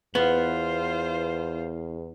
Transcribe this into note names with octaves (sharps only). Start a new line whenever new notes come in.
E2 B3 F4 C5